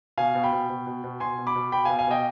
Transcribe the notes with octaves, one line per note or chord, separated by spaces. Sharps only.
B2 F5 G#5
B2
G5 B5
B2
B2
B2
B2
B2 G#5 C6
B2
B5 D6
B2
B2 G5 B5
B2 F5 G#5
F5 G#5
B2 D#5 G5